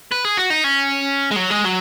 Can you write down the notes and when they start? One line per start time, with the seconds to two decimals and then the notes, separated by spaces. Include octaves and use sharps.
0.12 B4
0.25 G#4
0.37 F#4
0.50 D#4
0.64 C#4
1.31 G#3
1.37 F#3
1.51 G#3
1.65 F#3